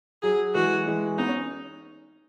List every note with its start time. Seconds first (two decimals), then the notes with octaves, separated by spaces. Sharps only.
0.23 F#3 G#4
0.55 E3 G#3 F#4
0.86 E3 G#3
1.18 B3 D#4
1.28 C#4